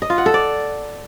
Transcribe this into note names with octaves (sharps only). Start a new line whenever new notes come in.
D#5
F4
F#5
A4
D5